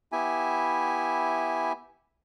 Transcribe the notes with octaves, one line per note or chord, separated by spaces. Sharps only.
B3 E4 G4 E5 G#5